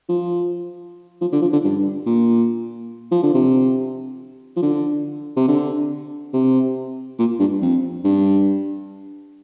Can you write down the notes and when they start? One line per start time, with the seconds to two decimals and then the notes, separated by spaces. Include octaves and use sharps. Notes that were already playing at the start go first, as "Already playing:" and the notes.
0.09 F3
1.21 F3
1.32 D3
1.42 F3
1.53 D3
1.64 G2
2.06 A#2
3.11 F3
3.23 D3
3.34 C3
4.56 F3
4.62 D3
5.36 C3
5.48 D3
6.33 C3
7.19 A#2
7.39 G2
7.62 F2
8.04 G2